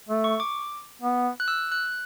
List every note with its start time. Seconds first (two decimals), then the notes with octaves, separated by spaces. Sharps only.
0.09 A3
0.24 C#6
0.40 D6
1.02 B3
1.40 F#6
1.48 E6
1.72 F#6